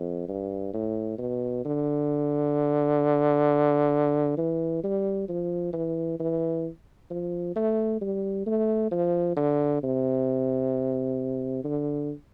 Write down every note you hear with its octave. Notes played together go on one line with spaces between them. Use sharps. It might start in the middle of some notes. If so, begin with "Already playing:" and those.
Already playing: F2
G2
A2
B2
D3
E3
G3
F3
E3
E3
F3
A3
G3
A3
F3
D3
C3
D3